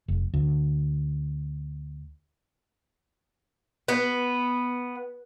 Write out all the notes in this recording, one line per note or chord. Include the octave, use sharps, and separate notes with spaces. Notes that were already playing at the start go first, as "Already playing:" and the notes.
F1
D2
B3